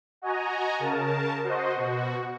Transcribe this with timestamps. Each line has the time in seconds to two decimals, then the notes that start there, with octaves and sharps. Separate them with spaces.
0.22 F#4 D#5 G#5 A#5
0.79 C#3 A#4 A5
1.44 F#4 C5 D#5
1.75 B2 F#4